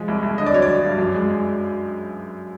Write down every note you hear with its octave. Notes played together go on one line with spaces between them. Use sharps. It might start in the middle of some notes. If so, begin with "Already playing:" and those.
Already playing: F3 G#3
C2
C2
D3 D#5
D5
F#3 C#5
D5
F#3
G2
F#2
G#3